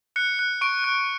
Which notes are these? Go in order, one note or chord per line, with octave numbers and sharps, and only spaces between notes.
F#6 C#7
F#6
C#6 D7
F#6